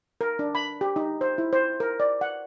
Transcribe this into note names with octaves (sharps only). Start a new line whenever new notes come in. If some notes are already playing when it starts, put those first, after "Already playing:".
A#4
D4
B5
G4
D#4
C5
E4
C5
A#4
D5
F#5